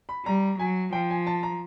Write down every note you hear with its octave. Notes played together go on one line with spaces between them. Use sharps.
B5
G3 A#5
F#3 G#5
F3 G5
G#5
A5
A#5